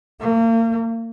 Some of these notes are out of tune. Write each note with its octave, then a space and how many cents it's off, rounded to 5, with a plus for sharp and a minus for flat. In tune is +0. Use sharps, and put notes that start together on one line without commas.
A#3 -35